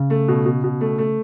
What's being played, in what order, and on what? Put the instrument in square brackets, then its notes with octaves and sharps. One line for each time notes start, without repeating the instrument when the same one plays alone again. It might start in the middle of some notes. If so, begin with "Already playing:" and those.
Already playing: [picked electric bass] C#3
[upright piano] A3
B2
B2
B2
A3
A3